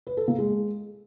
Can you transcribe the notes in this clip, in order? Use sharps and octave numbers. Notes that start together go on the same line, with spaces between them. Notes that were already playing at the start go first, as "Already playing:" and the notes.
B4
A4
A#3
G#3